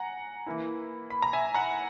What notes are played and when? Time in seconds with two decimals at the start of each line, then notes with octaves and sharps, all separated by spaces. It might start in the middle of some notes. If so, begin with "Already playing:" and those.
Already playing: F#5 G#5 A#5
0.46 E3 A#3 E4
1.10 B5
1.22 A#5
1.33 E5 G#5
1.54 F#5 A#5